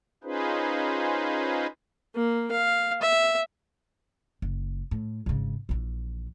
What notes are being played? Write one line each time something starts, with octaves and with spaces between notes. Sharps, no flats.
C#4 D#4 F4 G#4 B4 C5
A#3
F5
E5
F#1
A2
G#1 C#3
A#1 E3